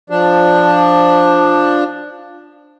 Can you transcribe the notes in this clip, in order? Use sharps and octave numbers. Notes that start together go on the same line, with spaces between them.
F3 D4